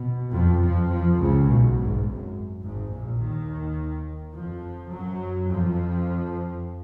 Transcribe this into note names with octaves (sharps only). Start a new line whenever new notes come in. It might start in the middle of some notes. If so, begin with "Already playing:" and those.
Already playing: B2
F2 F3
F2 F3
F2 F3
C#2 C#3
B1 B2
G#1 G#2
F#2
G#1 G#2
A#1 A#2
D#2 D#3
F2 F3
F#2 F#3
F2 F3